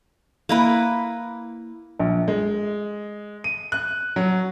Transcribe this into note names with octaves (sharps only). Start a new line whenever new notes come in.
A#3 E4 B4
A#1
G#3
D#7
F#6
F#3